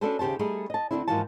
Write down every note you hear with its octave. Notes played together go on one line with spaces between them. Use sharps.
C#4 D4 F#4 A4 B4 C5
D#2 C#3 G4 C5 A5
G3 A3 B3 D#4 G#4 A4
D#5 A5
D2 G2 D3 C4 D4 E4
G#2 E3 F3 A#3 F#4 A5